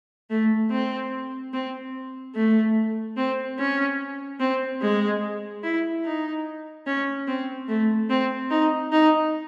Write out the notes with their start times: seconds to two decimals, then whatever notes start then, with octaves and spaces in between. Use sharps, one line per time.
0.30 A3
0.71 C4
1.53 C4
2.35 A3
3.17 C4
3.59 C#4
4.40 C4
4.82 G#3
5.63 E4
6.05 D#4
6.87 C#4
7.28 C4
7.68 A3
8.10 C4
8.51 D#4
8.92 D#4